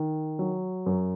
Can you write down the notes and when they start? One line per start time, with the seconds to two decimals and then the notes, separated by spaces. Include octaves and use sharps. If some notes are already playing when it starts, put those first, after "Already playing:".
Already playing: D#3
0.39 F#3
0.86 F#2